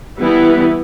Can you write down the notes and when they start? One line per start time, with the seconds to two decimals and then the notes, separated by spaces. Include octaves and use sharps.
0.18 E3 G3 B3 E4